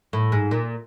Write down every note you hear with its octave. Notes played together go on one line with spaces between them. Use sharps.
A2
G#2
A#2